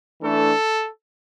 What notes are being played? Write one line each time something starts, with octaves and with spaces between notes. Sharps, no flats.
E3 A3 D4 A4